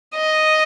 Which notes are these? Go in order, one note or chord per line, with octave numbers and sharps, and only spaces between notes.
D#5